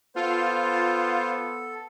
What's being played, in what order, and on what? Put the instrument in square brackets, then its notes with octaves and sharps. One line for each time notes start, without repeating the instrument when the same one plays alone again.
[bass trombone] B3 [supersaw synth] F4 [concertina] A4 [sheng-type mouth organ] C5